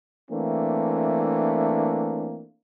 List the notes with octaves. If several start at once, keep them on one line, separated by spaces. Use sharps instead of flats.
E3 A3 A#3 C4 D4